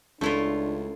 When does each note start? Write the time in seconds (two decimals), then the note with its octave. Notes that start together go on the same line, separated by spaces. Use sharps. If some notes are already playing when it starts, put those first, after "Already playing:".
0.21 C#2 A3 D4 E4 F4